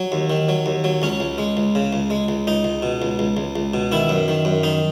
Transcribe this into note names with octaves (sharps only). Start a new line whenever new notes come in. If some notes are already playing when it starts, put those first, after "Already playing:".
Already playing: F#3
D#2
D#3
F#3
D#2
F#3
C#2 C#4
C#2
G#3
C#2
C#3
C#2
G#3
C#2
C#2 D#4
C#2
B2
C#2
C#2
C#2
C#2
B2
D#3 E4
F#2
D#3
F#2
D#3 D#4